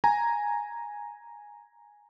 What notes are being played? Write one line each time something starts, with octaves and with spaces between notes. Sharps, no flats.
G#5 A#5